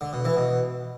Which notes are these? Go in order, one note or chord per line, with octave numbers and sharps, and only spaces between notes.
D3
B2
E3
B2